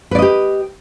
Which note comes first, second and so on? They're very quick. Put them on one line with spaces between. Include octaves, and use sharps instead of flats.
B4 D5 D#5 G4